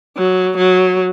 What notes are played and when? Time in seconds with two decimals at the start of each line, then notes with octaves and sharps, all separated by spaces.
0.17 F#3
0.57 F#3